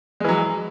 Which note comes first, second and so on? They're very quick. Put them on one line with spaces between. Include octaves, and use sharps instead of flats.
G#3 E3 F#3